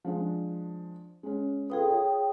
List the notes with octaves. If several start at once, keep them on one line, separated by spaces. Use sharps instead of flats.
F3 G#3 D4
G#3 C#4
F4 G#4 A4 B4 G5 D#6
F4 C#5